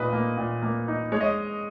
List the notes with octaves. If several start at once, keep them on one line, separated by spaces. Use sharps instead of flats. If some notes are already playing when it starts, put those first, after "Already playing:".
Already playing: A#2 D#4 B4 D#5
A#3
A#2
A#3
D#4
G#3 C#5
D#5